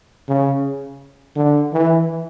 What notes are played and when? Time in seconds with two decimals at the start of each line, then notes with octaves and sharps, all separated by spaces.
0.29 C#3
1.36 D3
1.73 E3